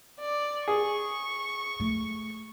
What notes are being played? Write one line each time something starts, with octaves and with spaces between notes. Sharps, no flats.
D5
G#4 C#6
A3